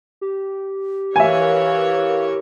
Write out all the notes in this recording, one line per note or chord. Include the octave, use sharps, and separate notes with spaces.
G4
E3 A#4 C#5 E5 F5 G#5